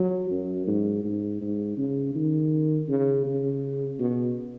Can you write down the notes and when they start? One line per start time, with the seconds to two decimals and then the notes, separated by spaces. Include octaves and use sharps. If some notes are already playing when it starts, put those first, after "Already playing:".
Already playing: F#3
0.31 F#2
0.67 G#2
1.04 G#2
1.41 G#2
1.77 C#3
2.15 D#3
2.89 C#3
3.26 C#3
3.99 B2